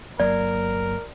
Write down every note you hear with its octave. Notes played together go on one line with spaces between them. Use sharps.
G1 F#3 A#3 A#4 D5